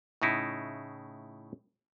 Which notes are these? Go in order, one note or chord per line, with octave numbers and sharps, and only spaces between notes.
A2 C#3 D#4 E4